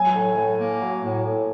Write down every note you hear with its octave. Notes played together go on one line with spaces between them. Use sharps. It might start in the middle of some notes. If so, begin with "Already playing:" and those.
Already playing: F#3 G#5
A2
A2
A#3
F#3
A2
A2